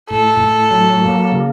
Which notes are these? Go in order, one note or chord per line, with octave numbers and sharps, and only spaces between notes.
A2 A4
A2
F#3
A#3
C#3